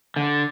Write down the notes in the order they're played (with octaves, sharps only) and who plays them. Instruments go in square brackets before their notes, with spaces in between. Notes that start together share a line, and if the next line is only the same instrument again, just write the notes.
[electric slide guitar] D3